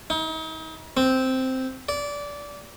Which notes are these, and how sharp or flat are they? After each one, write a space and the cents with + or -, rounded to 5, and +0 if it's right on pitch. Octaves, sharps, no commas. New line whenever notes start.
D#4 +40
C4 -5
D5 -20